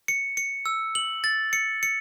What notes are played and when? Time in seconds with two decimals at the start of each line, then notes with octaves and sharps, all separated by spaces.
0.08 C#7
0.37 C#7
0.66 E6
0.95 F#7
1.24 A6
1.53 C#7
1.83 C#7